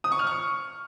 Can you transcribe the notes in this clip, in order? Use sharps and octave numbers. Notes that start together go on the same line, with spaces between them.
D#6
C#6
F6
C#6